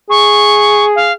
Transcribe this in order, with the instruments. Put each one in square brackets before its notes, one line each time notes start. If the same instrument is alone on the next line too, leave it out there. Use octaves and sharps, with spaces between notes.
[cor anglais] G#4 [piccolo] C#6
[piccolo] F5